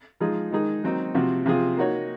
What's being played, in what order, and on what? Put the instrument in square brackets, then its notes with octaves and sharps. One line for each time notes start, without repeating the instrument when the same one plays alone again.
[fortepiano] F3 G#3 D#4 G#4
D#3 G#3 D#4 G#4
D#3 F#3 C4 D#4
C3 F3 C4 F#4
C3 F3 C4 F4 G#4
A#3 D#4 F#4 C#5